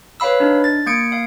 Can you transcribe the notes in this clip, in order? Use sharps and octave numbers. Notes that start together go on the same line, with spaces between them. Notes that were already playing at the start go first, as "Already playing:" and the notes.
B4 C#5 F5 B5 E6
D4 D#4
A6
A#3 G#6 C#7 D7
F5